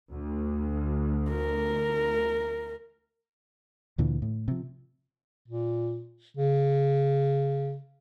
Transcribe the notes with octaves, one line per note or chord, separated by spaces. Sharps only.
D2
A#4
D2 A#2 D3 E3
A2
C3 F3
A#2
C#3